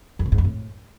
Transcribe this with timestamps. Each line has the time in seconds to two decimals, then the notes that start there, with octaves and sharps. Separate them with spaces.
0.19 F2
0.26 C3
0.32 G#2
0.38 F2
0.44 A2